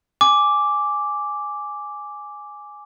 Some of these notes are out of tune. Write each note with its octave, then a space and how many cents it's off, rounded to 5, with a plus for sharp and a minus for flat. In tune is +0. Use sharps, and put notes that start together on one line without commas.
G#5 +0 D6 -5